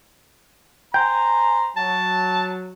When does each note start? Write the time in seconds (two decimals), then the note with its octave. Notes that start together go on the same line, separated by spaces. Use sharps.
0.94 C5 G5 G#5 A#5
1.77 F#3 A5